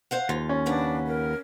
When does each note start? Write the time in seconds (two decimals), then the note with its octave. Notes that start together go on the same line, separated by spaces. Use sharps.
0.11 C5 F5 F#5
0.29 D#2 F4
0.49 C#4
0.66 C#3 D4 B4 F#5
1.07 A#4